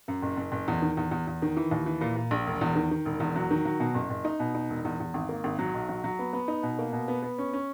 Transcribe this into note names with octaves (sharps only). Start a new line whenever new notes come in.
F#2
F#1
F#1
F#1
E2
D#3
E2
E2
E2
D#3
E3
D#2
E3
A#2
A#2
A#1
E1
E2
D#3
D#3
E1
E2
F#3
D#3
F#3
B2
F#1
F#1
D#4
B2
D#4
E1
E2
E2
G#1
A#3
G#1
F#3
B1
F#3
F#3
B3
B3
D#4
B2
A#3
B2
B3
B3
C#4
C#4